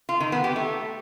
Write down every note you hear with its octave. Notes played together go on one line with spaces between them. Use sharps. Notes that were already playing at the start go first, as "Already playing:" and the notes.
F4
D#3
B3
G4
A3